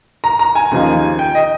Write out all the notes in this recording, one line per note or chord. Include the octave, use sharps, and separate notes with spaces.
A#5
A#5
G#5
D#2 C#3 F3 A#3 D#4
G5
D#5